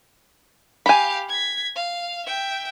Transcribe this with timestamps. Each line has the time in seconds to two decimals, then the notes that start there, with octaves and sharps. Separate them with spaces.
0.86 G4 F5 G#5 B5
1.29 G#6 B6
1.75 F5
2.26 E5 G5